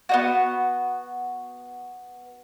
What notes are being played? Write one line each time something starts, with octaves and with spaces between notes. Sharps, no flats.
B3 D#4 F#4